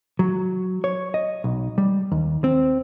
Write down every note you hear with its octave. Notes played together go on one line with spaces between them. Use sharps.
F#3
C#5
D#5
B1
G3
D#2
C4